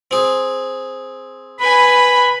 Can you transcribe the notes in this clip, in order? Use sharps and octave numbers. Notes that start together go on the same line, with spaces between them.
C4 G#4
B4 G#5 B5